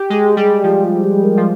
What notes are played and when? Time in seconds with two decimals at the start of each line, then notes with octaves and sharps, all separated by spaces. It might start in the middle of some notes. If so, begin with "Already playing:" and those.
Already playing: G4
0.10 G#3 G#4
0.37 G3 G#4
0.63 F3 G4
0.84 F4
1.04 G4
1.24 A#4
1.37 F3